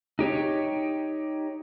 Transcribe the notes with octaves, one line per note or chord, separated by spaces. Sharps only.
D#4 G4 C#5